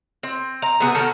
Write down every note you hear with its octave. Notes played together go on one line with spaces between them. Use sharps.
C4
A#5
C3 B3 G#4
D#3 C#4 F#4 A4